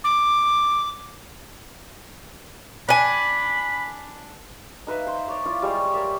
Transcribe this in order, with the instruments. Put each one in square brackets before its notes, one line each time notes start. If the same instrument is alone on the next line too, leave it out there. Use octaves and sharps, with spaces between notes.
[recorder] D6
[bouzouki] D4 G#5 [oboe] B5
[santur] D#4 B4 E5 F5
C5
C#5 D5
E4 F4 D5
G3 G#3 F4 C#5
A#4 C#5 D5 E5